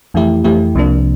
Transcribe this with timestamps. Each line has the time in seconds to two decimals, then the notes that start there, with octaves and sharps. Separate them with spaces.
0.14 F2 E3 A3 E4 G4
0.44 F2 E3 A3 E4 G4
0.75 C2 C3 F3 A#3 D4